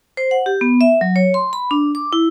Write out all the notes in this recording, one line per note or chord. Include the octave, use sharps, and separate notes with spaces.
C5
F#5
G4
B3
E5
F#3
C#5
C6
B5
D4
D6
E4